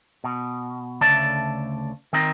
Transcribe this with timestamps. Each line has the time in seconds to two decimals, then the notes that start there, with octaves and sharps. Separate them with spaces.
0.24 B2
1.01 D2 C#3 A3 D5 A5
2.13 D#3 C4 D#4